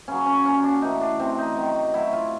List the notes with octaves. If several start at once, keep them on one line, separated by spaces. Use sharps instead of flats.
C#3 F#3 C#4
C#4
A#2 F#3 C#4
D4
A2 E3 D#4
D4
C3 E3 C4
D#4
C3 D#3 F#3
A2 F#3 E4
F4